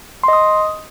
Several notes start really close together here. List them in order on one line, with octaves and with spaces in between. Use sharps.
C6 D#5 D#6